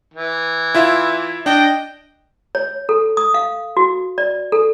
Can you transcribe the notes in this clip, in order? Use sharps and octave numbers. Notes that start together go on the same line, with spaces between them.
E3
E4 F4 E5
D4 D#5 G5
C#5
A4
D#6
F5
F#4
D5
A4